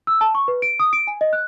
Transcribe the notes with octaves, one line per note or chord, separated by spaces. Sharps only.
E6
A5
C#6
B4
D7
D#6
D7
G#5
D#5
F#6